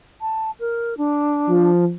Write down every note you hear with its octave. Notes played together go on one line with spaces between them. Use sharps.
A5
A#4
D4
F3